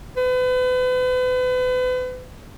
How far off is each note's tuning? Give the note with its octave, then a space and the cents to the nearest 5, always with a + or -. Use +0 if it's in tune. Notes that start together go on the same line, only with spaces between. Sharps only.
B4 +40